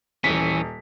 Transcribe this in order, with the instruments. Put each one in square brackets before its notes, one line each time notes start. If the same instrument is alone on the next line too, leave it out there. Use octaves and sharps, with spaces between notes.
[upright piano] D#1 B6 [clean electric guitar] E3 C#4